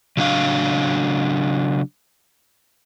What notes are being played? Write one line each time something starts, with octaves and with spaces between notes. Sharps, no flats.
C#3 F#3 D4 F5